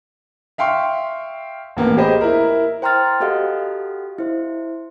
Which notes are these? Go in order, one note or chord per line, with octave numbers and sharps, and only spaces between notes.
E5 F5 G5 C6 C#6
A1 A#3 B3
G4 G#4 C5 D#5 B5
E4 A#4
C5 G5 A#5 C6 F6 A6
F#4 G4 A4 D#5 F5 F#5
E4 C5